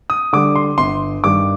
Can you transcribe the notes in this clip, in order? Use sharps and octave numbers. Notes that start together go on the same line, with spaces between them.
D#6
D3 G3 D6
C6
G1 C6
G2 D#3 G3 D6